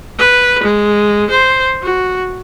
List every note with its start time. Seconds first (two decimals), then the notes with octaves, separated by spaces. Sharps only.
0.18 B4
0.63 G#3
1.30 C5
1.83 F#4